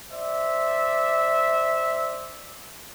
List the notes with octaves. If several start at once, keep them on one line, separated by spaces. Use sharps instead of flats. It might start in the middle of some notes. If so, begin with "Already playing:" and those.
C5 D5 E5